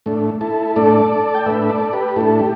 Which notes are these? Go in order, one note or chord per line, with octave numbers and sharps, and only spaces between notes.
A2 A3 D4
E4 A4
A2 A3 D4 A4 D5
G5
A2 A3 D4 B4 E5
A4 D5
G4 B4
A2 A3 D4 E4 A4
G4